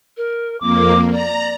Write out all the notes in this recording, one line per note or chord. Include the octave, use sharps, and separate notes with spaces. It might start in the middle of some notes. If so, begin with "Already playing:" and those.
A#4
F2 A#3 D6
D5 A#5